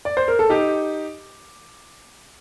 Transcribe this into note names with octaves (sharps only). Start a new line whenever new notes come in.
D5
C5
A#4
A4
D#4 G4